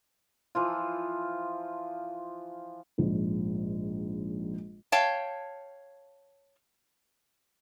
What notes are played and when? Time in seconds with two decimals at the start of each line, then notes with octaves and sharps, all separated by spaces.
0.55 E3 F3 F4
2.98 A#1 G#2
4.92 C#5 F5 G5 A5